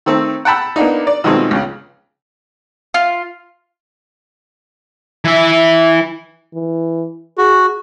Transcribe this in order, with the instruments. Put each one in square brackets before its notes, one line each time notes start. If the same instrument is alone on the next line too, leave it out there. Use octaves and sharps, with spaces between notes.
[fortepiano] D#3 A3 C4
F#5 G5 A5 B5 E6
A#3 B3 D4 D#4
D5
B2 D#3 F3 G#3 A3 C4
C#2 C#3
[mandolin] F4
[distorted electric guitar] E3 E5
[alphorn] E3
[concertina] F#4 [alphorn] G#4